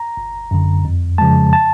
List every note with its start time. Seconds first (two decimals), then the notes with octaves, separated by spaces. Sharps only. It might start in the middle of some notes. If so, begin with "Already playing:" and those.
Already playing: A#5
0.17 G1
0.51 F#2 D3
0.85 F2
1.18 C#3 F3 G#3 A5
1.53 A5